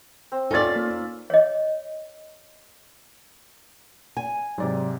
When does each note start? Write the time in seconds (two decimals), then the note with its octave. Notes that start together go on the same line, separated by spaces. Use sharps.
0.32 C4
0.51 C#4 D#4 F4 A4 D5 E5 A6
0.76 A#3
1.30 C#5 D#5
4.17 G#5
4.58 G#2 C3 F#3 D5